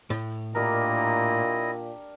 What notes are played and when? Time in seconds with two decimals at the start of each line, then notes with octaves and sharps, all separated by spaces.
0.10 A2
0.55 A#2 D4 E4 G4 A#4 D#5